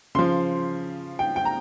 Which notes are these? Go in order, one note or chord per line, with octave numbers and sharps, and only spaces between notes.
C#3 F3 C6
G5
G5
A#5